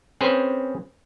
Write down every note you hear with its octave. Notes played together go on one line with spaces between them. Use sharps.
C4 C#4 G#4 B4 C5